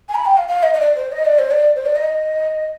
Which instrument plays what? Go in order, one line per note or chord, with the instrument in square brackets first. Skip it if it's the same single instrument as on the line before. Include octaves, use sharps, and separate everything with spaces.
[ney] G#5
B5
G5
F5
F5
D#5
D#5
D5
C5
D#5
D5
C5
D5
C5
D5
D#5